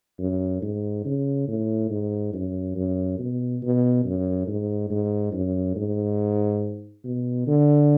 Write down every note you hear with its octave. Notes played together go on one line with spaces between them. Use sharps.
F#2
G#2
C#3
A2
G#2
F#2
F#2
B2
B2
F#2
G#2
G#2
F#2
G#2
B2
D3